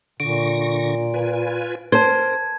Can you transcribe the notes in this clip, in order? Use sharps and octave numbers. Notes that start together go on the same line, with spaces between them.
A#2 D3 C#6 A#6 D7
F4 B4 G#5
A#4 C5 A5 G#6